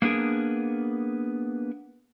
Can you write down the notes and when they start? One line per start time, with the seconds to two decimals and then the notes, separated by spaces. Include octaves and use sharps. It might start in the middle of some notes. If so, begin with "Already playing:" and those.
0.02 A#3 B3 D4 G#4 A#4